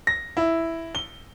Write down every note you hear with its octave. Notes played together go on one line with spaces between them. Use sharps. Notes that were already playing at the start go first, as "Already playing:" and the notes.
A#6
E4
G7